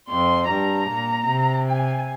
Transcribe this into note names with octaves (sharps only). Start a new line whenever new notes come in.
F2 C6
G2 A#5
A#2
C3
G#5